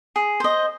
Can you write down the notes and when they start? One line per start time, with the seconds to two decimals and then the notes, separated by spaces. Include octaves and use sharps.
0.16 G#4
0.40 C5 D#5